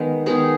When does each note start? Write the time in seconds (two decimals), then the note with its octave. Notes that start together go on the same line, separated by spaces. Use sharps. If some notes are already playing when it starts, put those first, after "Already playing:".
Already playing: D#3 G#3 B3
0.26 D#3 G#3 B3 G#4